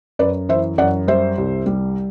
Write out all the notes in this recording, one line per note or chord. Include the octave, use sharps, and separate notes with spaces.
F#2 B4 D5
E3 C5 E5
F#2 D5 F#5
G3 C5 E5
C2
G3